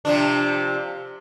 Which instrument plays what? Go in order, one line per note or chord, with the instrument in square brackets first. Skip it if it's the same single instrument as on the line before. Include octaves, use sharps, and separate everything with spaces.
[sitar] C3 F3 D4